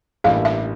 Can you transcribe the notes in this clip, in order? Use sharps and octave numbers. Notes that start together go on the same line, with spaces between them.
A1 G2 E3 G3 A#3 F5
E5